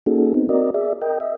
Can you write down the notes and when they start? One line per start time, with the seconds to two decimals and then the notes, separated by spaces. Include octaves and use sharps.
0.06 A#3 C#4 D#4 F#4 G#4 A4
0.34 B3 C4 D#4
0.49 C4 F#4 A#4 D5 D#5
0.74 G#4 D5 E5
1.02 A#4 D#5 G5
1.20 D#5 E5